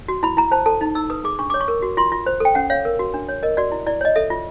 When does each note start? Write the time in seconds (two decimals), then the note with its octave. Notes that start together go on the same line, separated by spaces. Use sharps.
0.08 F#4
0.23 E4 B5
0.37 E4 A#5
0.51 C5 A5
0.66 A4 A5
0.81 D#4
0.95 D#4 E6
1.10 B4 D#6
1.24 G#4 D6
1.39 D4 C#6
1.50 C#5 D6
1.61 C#6
1.68 A#4
1.82 F#4
1.97 F4 C6
2.12 F4
2.26 C5
2.40 A4 G5
2.55 C#4 F#5
2.70 C#5 F5
2.85 A#4
2.99 F#4
3.14 D4
3.29 C#5
3.43 A#4 D#5
3.57 F#4 D5
3.72 E4
3.86 E4 D5
4.01 C#5 D#5
4.16 A4 E5
4.30 F4